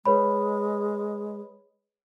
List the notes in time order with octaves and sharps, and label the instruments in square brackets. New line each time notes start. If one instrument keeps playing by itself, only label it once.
[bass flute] G#3 [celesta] B4 C#5 B5